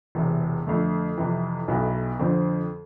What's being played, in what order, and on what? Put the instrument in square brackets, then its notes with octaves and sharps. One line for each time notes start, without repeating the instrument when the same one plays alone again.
[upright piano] E1 E2 C3
F2 D3 A3
F2 C3 E3
B1 B2 B3 E4 A4
F2 D3 F3 C4